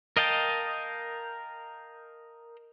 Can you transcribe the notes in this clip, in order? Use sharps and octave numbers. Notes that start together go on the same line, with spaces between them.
A#4 D#5 F5 G5 A5